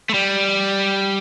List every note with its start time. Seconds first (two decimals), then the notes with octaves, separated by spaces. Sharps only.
0.09 A3
0.14 G3